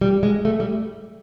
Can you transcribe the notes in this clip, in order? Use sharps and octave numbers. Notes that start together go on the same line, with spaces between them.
G3
G#3
A3
G3